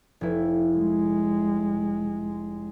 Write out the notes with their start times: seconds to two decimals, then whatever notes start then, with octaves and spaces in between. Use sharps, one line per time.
0.21 F1 E4
0.78 G#3